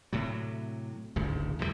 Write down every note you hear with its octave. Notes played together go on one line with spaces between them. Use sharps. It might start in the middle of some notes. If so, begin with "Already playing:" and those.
A2 C3 F#3
D1 G#1 D2 C#3
A#1 E2 G2 G3